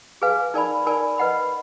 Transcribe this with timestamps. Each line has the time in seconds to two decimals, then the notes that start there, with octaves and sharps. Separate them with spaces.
0.22 G#4 B4 F5 G#5
0.54 D#4 A#4 D5 G#5 B5
0.86 D#4 A#4 D5 G#5 B5
1.18 B4 D#5 F#5 B5